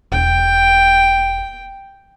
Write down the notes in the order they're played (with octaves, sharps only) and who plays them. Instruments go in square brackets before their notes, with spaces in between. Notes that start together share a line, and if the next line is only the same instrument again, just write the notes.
[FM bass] E1 [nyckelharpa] G5